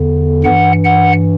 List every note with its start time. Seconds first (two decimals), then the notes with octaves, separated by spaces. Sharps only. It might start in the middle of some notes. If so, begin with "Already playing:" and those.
Already playing: E2 D3
0.44 G2 E3 F#5
0.85 F#5